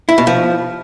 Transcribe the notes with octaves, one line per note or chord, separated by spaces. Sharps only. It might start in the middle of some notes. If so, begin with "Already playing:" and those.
E4
B2
F3